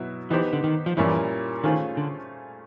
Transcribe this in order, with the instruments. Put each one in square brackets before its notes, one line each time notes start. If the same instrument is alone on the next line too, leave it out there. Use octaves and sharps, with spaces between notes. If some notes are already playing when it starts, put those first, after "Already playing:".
Already playing: [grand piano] B2 F#3 B3 E4
[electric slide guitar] E3 [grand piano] B3 D#4 G4 C5
[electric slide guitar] D3
D#3
F3
[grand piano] A#2 G3 A#3 C#4 E4 [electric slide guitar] E3
[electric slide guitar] D#3 [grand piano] A3 C#4 F4 G#4 C5
[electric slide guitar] D3